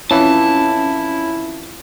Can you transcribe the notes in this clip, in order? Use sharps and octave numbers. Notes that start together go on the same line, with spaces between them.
F2 E3 C#4 E4 A5